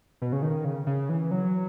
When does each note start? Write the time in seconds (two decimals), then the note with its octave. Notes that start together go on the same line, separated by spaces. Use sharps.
0.22 B2
0.32 C#3
0.42 D#3
0.65 C#3
0.87 C#3
1.09 E3
1.31 F#3